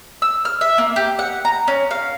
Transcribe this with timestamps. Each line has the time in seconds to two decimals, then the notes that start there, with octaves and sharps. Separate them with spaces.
0.22 E6
0.45 F6
0.61 E5
0.78 A#3
0.96 G4
1.19 F#5
1.45 A#5
1.68 C#4
1.91 F5